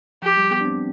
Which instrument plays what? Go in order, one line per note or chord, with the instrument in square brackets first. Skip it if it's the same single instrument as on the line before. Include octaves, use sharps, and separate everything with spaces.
[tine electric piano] F3 [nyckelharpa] G4
[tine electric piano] G3
B3
D4
C4